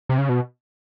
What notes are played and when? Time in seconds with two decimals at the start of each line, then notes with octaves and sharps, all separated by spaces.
0.09 C3
0.18 C#3
0.29 B2